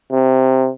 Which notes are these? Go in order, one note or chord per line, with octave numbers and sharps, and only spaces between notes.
C3